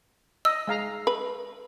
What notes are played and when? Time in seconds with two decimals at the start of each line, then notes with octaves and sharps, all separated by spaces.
0.45 D#5 E6
0.67 G#3 F5 A#5
1.07 B4